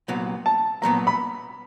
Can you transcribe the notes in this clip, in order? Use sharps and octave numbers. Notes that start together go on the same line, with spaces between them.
C2 A#2 F#3 B3
A5
C2 A#2 F#3 B3 A#5
B5